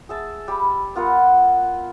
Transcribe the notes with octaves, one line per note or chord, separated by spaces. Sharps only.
G#4 E5 A5
G3 G4 A5 B5
B3 F4 A#4 F#5